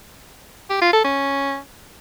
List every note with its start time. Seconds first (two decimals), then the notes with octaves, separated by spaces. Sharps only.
0.70 G4
0.81 F4
0.93 A4
1.04 C#4